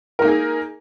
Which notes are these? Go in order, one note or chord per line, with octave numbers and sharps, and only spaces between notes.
A#3 D#4 G#4 A#4